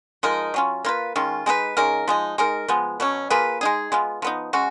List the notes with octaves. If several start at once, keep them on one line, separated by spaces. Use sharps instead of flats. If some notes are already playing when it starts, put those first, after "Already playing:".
F3 G#3 D#4 A#4
F#3 C#4 F4
A#3 F4 B4
D#3 G#3 C#4 F4
G#3 D#4 G#4 B4
C#3 G#3 D#4 A#4
F3 G#3 D#4
G#3 D#4 A#4
F3 G#3 B3
B2 F#3 C#4
A#3 F4 G#4 B4
G#3 D#4 G#4
G#3 B3 F4
F3 B3 D#4
G#3 C#4 F#4